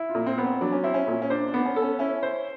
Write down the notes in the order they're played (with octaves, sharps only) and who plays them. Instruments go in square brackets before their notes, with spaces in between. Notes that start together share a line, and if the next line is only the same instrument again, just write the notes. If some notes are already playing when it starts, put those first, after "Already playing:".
Already playing: [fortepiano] E4
[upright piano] F4
[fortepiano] A#2
[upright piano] C4
[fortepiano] B3
[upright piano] C4
[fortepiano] F#3 [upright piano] D4
[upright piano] C#4
[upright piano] C4 [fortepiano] E4
[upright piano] C#4
[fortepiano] A#2
[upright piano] C#4
[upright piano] D4 [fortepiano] C5
[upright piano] D4
[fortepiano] B3
[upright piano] C#4
[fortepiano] A4
[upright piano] C#4
[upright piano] C#4 [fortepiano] E4
[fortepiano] C5